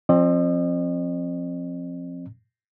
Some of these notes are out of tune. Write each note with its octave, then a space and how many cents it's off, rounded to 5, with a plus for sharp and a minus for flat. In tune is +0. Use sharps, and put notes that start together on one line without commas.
F3 +0 C4 +20 D#5 -40